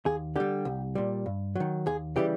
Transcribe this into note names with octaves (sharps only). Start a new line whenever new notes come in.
D#2 G#4
D3 G3 G4
C2
A#2 G3
G2
D#3 F#3
D#2 G#4
C#3 E3 G3 G4